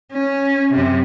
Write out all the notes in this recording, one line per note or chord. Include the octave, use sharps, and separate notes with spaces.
C#4
F#2 C3